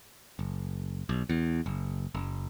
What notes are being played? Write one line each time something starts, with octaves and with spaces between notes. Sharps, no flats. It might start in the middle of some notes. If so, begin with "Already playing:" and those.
F#1
B1
E2
F#1
F#1